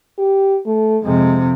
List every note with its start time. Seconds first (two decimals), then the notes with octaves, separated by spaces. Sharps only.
0.18 G4
0.66 A3
1.04 F2 C3 G#3